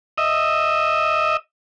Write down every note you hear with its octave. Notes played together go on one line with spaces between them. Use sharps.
D#5 E5